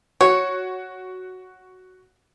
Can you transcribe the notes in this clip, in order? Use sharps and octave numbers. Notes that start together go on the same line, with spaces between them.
F#4 C#5